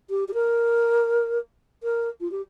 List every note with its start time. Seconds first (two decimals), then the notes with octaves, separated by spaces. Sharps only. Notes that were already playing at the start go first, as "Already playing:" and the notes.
0.10 G4
0.28 G4
0.34 A#4
1.83 A#4
2.21 F4
2.31 G4